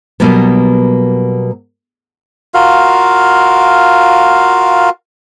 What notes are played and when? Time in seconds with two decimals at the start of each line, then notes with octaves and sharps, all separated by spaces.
0.20 B2 F#3 G3 A#3 B3
2.54 F4 F#4 A#4 F5